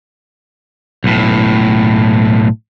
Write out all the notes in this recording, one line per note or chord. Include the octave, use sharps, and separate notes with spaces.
B1 A2